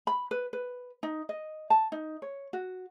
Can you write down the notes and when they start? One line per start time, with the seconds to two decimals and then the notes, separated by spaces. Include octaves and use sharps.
0.07 B5
0.31 B4
0.53 B4
1.03 D#4
1.29 D#5
1.70 A5
1.92 D#4
2.22 C#5
2.53 F#4